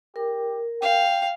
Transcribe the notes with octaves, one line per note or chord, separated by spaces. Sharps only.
G4 A#4
F5 G5